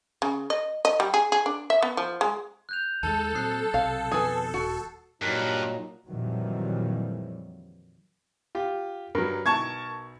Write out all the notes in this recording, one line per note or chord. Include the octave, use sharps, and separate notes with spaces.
C#3
D#5
D#5
G3
G#4
G#4
D4
E5
B3
F3
G#3
F#6 G6 F7
D#2 D#3 G#3 A4 A5
A#2 F#3 C4 D#6 F#6 C7
B1 C3 F5
F2 B2 D#3 G#4 B4
D#1 F#4
G2 A#2 F#3 D#4 A#4 F#6
F2 A#2 D#3 E3 F#3 G3
F4 G4
G2 F#3 A#4
B1 A5 C#6 G#6